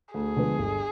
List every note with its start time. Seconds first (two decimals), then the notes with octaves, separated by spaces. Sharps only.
0.14 D2 G#4
0.36 D3 F3 G#3 B3
0.59 G1